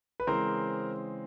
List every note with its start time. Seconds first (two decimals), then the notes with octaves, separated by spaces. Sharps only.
0.20 B4
0.27 C#3 E3 G#3 C4 A#4 C5